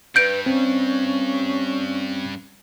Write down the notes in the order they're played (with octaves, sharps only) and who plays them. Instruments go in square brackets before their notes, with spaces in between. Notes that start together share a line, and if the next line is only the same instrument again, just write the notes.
[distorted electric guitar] G2 [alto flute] B4 [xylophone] G6 D7
[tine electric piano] C4 [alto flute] C#4